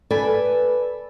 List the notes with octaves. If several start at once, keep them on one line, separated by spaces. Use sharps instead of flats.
A4 B4 D5 G#5